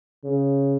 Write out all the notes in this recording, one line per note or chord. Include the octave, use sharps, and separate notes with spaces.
C#3